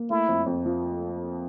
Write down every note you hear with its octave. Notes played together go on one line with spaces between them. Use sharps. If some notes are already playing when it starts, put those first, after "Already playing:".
Already playing: A#3
A3 E4
F2
F2
F3